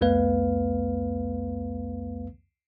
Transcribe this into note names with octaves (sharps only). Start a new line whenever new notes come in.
C2 F2 A3 B3 B4 F5